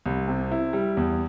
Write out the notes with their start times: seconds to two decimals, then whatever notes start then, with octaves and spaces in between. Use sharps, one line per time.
0.06 C2
0.28 C3
0.52 E4
0.73 G3
0.97 E2